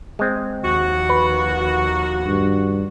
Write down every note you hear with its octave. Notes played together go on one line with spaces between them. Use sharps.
G#3 C4
D#2 F3 F#4
B4
G2